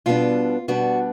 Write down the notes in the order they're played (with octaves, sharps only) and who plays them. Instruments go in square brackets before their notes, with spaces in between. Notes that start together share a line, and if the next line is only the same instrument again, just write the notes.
[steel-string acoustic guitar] B2 G3 B3 D4 F4
B2 G3 B3 D4 F#4